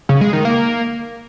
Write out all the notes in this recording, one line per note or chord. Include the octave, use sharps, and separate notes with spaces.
C#3
G#3
D#3
A#3